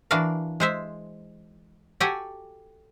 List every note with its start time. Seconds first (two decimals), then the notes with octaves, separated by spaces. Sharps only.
0.11 E3 D4 F#4 A#4 F5
0.60 G#3 C5 E5
2.00 F#4 G4 A4 F#5 G#5